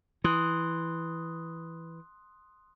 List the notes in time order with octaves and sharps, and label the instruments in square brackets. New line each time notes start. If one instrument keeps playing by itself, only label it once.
[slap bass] E3 [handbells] C6 D#6 F#6